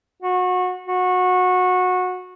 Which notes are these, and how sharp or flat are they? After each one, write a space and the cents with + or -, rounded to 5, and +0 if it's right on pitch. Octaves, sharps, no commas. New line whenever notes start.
F#4 -25
F#4 -20